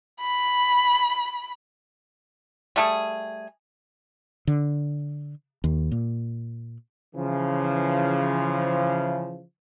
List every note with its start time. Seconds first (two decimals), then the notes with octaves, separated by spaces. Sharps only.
0.21 B5
2.76 G3 A3 G#4
4.47 D3
5.64 D#2
5.92 A#2
7.16 C#3 E3 F3